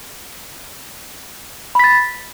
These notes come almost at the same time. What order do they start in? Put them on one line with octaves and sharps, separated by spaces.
B5 B6 A6